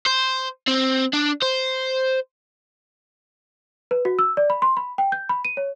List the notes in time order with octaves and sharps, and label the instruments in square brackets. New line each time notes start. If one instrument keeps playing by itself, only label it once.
[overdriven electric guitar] C5
C4
D4
C5
[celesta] B4
F#4
E6
D5
B5
C6
B5
G5
G6
B5
D#7
C#5